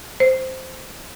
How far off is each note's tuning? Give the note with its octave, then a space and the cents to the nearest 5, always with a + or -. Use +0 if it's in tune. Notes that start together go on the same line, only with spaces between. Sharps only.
C5 -5